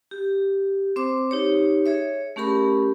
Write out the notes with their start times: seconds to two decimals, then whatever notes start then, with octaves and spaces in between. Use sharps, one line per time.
0.11 G4
0.96 C4 C5 D6
1.31 D#4 G4 C#5
1.86 G#4 C#5 E5
2.36 A3 C#4 G4 A#4 B5